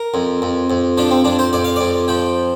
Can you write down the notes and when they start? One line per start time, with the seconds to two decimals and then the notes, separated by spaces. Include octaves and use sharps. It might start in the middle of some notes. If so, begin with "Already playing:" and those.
Already playing: A#4
0.14 F2
0.42 F2
0.70 F2
0.97 F3 D4
1.11 C4
1.24 F2 D4
1.39 C5
1.53 F2 D5
1.64 F5
1.76 F2 D5
2.08 F3 G5